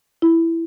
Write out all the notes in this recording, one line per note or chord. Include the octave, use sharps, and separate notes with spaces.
E4